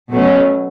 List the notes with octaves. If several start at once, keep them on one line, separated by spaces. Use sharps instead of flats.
B2 F#3 A3 C#4